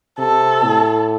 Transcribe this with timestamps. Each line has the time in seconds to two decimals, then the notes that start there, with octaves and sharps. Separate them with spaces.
0.18 C3 A4
0.64 A2